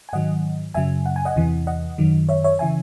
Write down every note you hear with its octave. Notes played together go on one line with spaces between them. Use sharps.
G#5
G#2 D#3 F#3 D#5 F#5
F#2 C#3 F#3 E5 G#5
F#5
G#5
D#5 F#5
E2 C3 E3
D#5 F#5
F#2 D#3 F#3
C#5 E5
C#5 E5
C#3 E3 E5 G#5